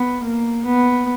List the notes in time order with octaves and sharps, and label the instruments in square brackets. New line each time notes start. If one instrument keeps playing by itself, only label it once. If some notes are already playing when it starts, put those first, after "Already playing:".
Already playing: [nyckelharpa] B3
A#3
B3